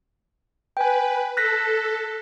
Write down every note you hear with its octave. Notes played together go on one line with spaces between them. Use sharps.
B4 G5 G#5
A4 F#6 A#6 B6